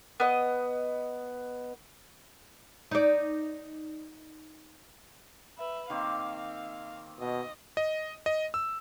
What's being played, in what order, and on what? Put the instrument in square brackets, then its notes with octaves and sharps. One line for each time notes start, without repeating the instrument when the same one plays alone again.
[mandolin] B3 D#5
[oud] D#4 D5
[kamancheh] B4 E5
[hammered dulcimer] D#3 A#3 C4 [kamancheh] F5
[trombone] B2 [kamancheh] D#5
[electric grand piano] D#5
D#5
E6